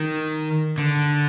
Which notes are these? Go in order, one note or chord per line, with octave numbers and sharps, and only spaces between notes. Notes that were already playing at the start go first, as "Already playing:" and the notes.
Already playing: D#3
D3